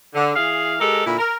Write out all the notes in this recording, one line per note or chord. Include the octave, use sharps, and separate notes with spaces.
D3
E3 G#4 F5
G#3 G4 A4 A#4
A#2 D3 E4
A#4